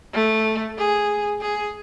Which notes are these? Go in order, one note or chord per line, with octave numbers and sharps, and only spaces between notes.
A3
G#4
G#4